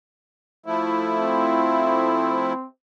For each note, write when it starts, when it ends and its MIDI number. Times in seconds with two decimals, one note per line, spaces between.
0.66 2.53 53
0.66 2.53 57
0.66 2.53 64
1.14 2.65 60